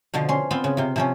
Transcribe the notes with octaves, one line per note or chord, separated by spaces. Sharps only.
B2 D3 F3
C#4 C6
B3 C4 F4
C#3
C3 F4
C3 F3 C#4